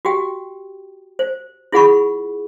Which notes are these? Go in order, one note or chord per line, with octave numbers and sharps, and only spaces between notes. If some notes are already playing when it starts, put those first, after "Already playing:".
F#4 G4 G5
C5
E4 F4 G#4 F#5 B5 C#6